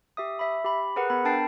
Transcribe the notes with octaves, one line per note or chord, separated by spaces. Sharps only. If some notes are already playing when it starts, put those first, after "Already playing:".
G4 E5 D#6
E5 B5
G4 B5
G#4 A#4 B4 F#5
B3 B5
D4 A#4 G5 A5 A6 C7